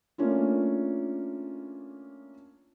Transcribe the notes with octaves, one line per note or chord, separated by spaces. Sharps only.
A3 A#3 C#4 D4 F4